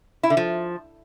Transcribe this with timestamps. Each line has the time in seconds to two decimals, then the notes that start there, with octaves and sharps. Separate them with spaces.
0.23 E4
0.30 D3
0.37 F3